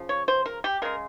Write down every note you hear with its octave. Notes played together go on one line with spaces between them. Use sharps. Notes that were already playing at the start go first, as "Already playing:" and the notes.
Already playing: C#3 F3
C#5
C5
A#4
G4
C#3 G#3 A#4